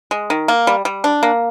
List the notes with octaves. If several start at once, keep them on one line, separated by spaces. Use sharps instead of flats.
G#3
D#3
A#3
G3
G3
D4
A#3